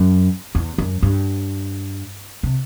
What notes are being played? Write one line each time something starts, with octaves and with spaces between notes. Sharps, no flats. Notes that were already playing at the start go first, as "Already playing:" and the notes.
Already playing: F#2
E2
F#2
G2
C3